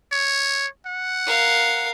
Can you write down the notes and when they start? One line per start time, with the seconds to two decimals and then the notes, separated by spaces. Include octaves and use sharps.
0.12 C#5
0.87 F#5
1.26 A#4 F5